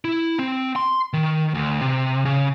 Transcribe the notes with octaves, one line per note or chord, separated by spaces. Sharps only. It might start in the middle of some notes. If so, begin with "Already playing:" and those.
E4
C4
C6
D#3
D2
C3
C#3